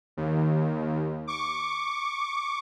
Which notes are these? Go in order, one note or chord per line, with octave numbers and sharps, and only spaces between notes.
D#2
C#6 D6